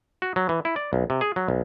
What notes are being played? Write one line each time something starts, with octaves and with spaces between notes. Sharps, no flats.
F#4
F#3
E3
E4
D5
B1
C3
G#4
F#3
B1